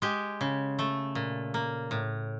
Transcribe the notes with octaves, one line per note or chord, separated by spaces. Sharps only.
G#3 G4
C#3
A3
A#2
A#3
A2